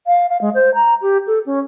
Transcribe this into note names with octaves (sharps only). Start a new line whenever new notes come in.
F5
F5
G#3
C5
A#5
G4
A4
C#4